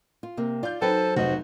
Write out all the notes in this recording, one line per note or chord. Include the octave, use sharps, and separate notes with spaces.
F4
C3 A#3 C4
F4 D5 G6
F#3 D#4 A4 B4 C5 G5
F1 G#2 F#4 D#5